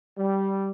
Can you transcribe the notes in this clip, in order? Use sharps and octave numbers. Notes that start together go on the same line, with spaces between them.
G3